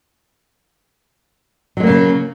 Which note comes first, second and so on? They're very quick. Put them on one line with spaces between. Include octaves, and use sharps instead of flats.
F#3 G#3 A#3 C#3